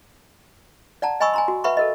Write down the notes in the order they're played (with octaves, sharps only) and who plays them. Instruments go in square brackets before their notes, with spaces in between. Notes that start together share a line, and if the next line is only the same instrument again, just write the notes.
[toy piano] D5 F#5 A5 A#5
D#5 G#5 B5 C#6 D#6 E6
G#5 A#5 C6
F#4
B4 E5 F#5 B5 C#6
A4 A#4 D#5